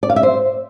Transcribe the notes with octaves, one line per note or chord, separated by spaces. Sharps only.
D5
F5
E5
C5